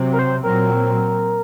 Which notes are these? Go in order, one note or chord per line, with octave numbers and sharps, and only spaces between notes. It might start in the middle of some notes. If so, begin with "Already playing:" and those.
Already playing: C3 F#3 C4
A#4
C5
A#2 F#3 C4 A#4